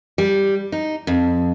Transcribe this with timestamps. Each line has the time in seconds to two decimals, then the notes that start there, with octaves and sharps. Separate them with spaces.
0.18 G3
0.72 D#4
1.07 F2